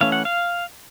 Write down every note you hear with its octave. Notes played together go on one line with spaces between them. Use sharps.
E3 A3 C#4 F5
F#5
F5